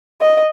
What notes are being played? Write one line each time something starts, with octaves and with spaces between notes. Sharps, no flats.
D#5